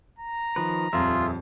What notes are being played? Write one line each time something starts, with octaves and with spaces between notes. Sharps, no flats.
A#5
D#3 F3 B4
D#1 F2 F4 G#4 E5